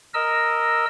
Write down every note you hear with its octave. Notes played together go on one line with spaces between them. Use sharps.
A#4 D#5 E6